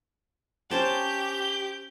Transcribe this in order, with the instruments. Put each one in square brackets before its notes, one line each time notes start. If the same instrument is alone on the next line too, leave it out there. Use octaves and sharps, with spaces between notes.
[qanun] C#4 C5 A5 [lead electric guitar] G4 [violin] G6